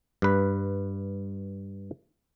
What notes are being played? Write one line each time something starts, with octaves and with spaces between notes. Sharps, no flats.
G2 B4